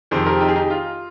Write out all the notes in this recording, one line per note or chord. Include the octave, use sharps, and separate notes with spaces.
F2 C3 D#3 G#4 C5
G4 A#4
D#4 G4
G#4
D#4 G4
F4